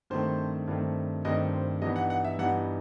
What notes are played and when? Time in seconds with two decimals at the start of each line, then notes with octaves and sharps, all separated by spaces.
0.10 G2 D#3 A3 C4 C5
0.68 G2 D#3 A3 C4
1.25 G2 D#3 A3 C4 D#5
1.53 C5
1.81 G2 E3 G3 B3 D#4 D#5
1.96 F#5
2.10 F#5
2.24 E5
2.39 G2 E3 G3 B3 D#4 F#5